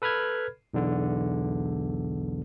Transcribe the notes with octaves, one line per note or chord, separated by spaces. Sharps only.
A4 B4 B5 F6 G#6
B1 E2 D3